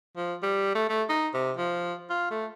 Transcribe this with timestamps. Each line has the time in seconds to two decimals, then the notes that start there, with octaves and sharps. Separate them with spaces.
0.16 F3
0.43 G3
0.75 A3
0.89 A3
1.09 D#4
1.33 C3
1.57 F3
2.10 F4
2.30 A3